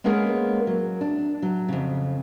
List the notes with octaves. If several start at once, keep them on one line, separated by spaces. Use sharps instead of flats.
G#3 A#3 B3 C#4 G#4 A#4
F#3
D4
F#3
F2 C#3